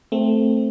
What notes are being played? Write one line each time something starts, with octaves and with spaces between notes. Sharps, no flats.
A3 C4